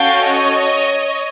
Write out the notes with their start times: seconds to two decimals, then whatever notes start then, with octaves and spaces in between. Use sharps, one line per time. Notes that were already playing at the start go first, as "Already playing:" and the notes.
Already playing: C#4 F#4 A4 F5 G5
0.24 C#5 D#5